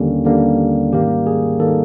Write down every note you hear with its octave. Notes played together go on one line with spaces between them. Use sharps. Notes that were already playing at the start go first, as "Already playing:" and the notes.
Already playing: D#2 D3 G3 A#3 C#4
D#2 D3 G3 A#3
G#2 D#3 G3 A#3 G4
G#4
D#3 G3 A#3 A4